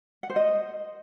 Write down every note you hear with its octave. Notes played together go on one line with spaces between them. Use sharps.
F#5
C5
D#5